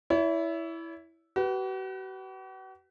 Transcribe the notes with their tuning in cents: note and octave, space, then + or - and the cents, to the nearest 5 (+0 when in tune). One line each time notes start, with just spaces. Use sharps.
E4 +0 C#5 +45
F#4 +45 B4 +0